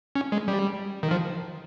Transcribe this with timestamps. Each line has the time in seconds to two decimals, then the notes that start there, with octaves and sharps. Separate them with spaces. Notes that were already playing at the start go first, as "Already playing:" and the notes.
0.15 C#4
0.32 G#3
0.48 G3
1.03 D#3
1.11 F3